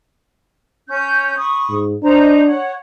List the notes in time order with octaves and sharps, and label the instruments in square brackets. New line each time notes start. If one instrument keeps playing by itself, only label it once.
[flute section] C#4 G6
B5 C#6 D#6
[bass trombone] G#2
[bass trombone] D4 [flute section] D#4 C5 A#5
[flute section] C#5 F#5